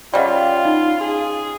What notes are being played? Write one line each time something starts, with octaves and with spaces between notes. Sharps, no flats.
C#3 G3 F4 D5 D#5 F#5
D#4
G#4